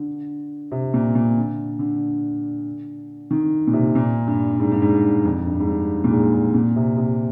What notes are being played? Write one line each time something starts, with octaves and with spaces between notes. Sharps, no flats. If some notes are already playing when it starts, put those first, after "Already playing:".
Already playing: D3
C3
A#2
A#2
D3
D3
D#3
A#2
C3
A#2
G2
G2
G#2
G2
G#2
F2
G2
G#2
G2
A#2
G#2
G#2
A#2
C3
C3